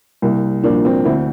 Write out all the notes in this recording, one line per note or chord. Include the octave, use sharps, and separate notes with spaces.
C2 A#3
A#2 F3 A#3 D4
C4
D2 C4 E4